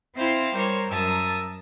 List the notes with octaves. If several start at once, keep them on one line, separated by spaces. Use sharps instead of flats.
C4 E4 C5 F5 G5
G3 A#4 C5 C#5
F#2 A#4 E5 A5 D#6